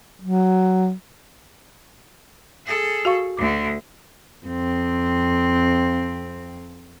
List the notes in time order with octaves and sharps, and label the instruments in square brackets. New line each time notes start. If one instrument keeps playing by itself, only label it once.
[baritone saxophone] F#3
[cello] G#4 A4
[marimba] F#4 F5 C#6
[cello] D2 D3 [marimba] D6
[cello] F2 C4